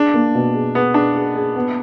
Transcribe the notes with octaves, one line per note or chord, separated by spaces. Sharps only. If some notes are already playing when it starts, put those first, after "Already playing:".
Already playing: D4 G#4
A#3
B2
G#4
B3 G#4
D4 G#4
G#4
G#4
B3